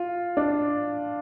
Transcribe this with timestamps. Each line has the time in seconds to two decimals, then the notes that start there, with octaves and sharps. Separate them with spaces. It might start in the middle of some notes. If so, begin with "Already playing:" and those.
Already playing: F4
0.37 D4